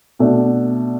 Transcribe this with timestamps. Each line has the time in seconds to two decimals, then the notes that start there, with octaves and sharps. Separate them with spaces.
0.19 B2 A3 D4